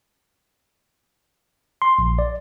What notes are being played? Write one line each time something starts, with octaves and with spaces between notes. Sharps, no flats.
C6
A#1
D5